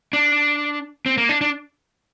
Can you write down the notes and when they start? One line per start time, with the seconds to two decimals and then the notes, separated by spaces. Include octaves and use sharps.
0.13 D4
1.06 C4
1.18 A#3
1.29 D4
1.41 D4